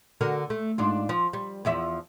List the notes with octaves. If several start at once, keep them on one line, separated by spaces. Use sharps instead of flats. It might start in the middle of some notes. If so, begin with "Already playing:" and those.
D3 F#4 A#4
A3
G#2 D4 F4
F3
G3
E2 F3 E5